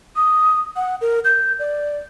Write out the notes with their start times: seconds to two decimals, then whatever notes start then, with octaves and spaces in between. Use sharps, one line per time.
0.16 D#6
0.76 F#5
1.01 A#4
1.25 G6
1.59 D5